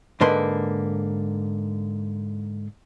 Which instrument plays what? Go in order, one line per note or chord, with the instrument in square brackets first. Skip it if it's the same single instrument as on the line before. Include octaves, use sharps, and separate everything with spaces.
[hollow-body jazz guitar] G#2 D3 A#3 B4 C6